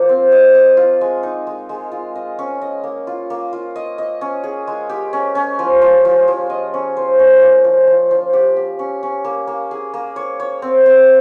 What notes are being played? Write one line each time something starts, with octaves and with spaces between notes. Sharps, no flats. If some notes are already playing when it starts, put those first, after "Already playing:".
Already playing: F3 A#3
C4
D#5
D#5
F4
G#3
D#4
G#3
G#3
F4
D#5
C#4
D#5
A#3
F4
A#3
F4
D#5
D#5
C#4
G#4
G#3
G4
C#4
C#4
F3
F3
F3
F3
D#5
C#4
C5
C#4
A#3
F3
F3
F3
G4
G4
C#4
C#4
A#3
A#3
G#4
A#3
C#5
C#5
C4
C4